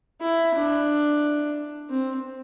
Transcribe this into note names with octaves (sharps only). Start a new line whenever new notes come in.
E4
D4
C4